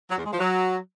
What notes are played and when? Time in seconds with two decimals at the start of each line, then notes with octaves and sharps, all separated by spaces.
0.09 F#3
0.17 E2
0.24 G#3
0.31 F3
0.39 F#3